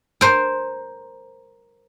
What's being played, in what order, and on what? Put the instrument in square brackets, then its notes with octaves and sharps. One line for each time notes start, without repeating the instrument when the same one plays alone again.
[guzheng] A#4 C5